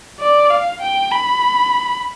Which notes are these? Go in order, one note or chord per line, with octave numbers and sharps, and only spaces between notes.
D5
F5
G5
B5